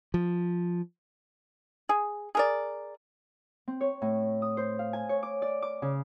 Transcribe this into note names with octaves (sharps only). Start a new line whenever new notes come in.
F3
G#4
G#4 A#4 D5
C4
C#5
A2
D#6
C5
F5
G#5
C#5
D6
D5
D6
C#3